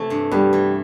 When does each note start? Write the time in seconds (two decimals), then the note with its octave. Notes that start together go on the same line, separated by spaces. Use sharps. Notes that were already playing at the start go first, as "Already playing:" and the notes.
Already playing: C3 E3 A3
0.10 G2
0.31 G2 G3 B3
0.53 E3